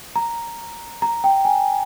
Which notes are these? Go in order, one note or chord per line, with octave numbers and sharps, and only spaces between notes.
A#5
A#5
G5
G#5